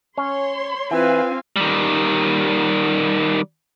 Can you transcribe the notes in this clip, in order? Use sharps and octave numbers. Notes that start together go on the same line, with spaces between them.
C#4 C#5 C6
E3 C4 F4 B4 F5 G#5
D#3 G3